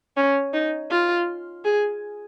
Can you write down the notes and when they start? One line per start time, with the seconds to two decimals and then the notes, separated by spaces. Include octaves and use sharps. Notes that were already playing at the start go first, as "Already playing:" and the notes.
0.17 C#4
0.53 D#4
0.91 F4
1.65 G#4